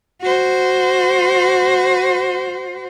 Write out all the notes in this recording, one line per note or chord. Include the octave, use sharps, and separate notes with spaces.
F#4 C5